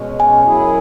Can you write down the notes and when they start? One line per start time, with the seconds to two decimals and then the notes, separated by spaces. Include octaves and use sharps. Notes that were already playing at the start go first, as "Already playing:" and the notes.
Already playing: B2 G#3 C#4
0.20 G#5
0.44 F#2 F#3 E4 G#4